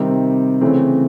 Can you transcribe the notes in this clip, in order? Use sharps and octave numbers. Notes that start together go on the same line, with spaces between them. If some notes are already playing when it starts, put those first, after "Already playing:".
Already playing: C3 D#3 G3 C4
C#3 E3 A3 C4